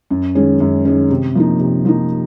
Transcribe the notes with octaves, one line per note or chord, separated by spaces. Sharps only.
F#2
D#3 G#3 C#4
F#2
D#3 G#3 C#4
C3
F3 A#3 D#4
C3
F3 A#3 D#4